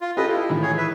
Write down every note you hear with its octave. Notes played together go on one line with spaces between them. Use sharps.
F4
F4 G4 A4 B4 D#5
E4
A2 D#3 E3
G#4 C#5
B4 E5